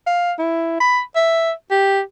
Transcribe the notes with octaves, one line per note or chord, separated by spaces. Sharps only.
F5
E4
B5
E5
G4